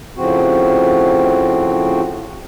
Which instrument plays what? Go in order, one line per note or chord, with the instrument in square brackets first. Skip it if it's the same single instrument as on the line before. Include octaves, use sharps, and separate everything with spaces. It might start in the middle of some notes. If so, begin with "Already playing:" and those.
[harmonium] A2 C#3 F3 C4 F#4